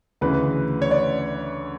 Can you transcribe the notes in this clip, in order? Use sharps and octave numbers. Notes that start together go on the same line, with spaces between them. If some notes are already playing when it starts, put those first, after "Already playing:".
D2 C#3 E3 B4
C#5
D5